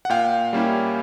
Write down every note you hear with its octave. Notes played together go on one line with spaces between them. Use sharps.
F#5
A#2 F5 G5
G3 A#3 C#4 E4